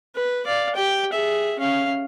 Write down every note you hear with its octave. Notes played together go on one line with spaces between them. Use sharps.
B4
D5 F5
G4 G5
G#4 E5
C#4 F5